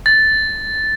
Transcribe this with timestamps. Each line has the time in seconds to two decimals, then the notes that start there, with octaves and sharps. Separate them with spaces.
0.06 A6